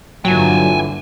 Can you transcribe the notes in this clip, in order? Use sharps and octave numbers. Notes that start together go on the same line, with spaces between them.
G2 A#2 D3 E3 F#3 F4 G5 G#5